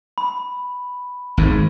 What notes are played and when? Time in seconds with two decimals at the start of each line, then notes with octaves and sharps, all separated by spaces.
0.18 B5
1.37 G#1 G#2